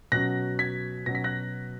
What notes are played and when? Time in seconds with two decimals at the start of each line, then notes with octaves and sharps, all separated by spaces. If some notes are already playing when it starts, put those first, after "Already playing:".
0.12 B2 F#3 C#4 F#6 A#6
0.59 G#6 B6
1.06 B2 F#3 C#4 A#6
1.15 B6
1.24 F#6 A#6